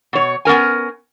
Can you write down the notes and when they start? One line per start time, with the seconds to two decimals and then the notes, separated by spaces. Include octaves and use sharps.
0.13 B2 C#5
0.45 B3 C#4 A#4 G#5